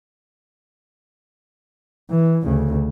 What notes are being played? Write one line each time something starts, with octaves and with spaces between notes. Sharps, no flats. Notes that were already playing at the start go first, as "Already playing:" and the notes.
E3
D2 C#3